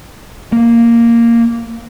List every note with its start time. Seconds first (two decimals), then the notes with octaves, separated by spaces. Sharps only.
0.52 A#3